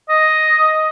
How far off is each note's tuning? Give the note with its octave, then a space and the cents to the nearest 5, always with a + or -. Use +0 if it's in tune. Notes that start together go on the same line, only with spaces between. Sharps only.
D#5 +5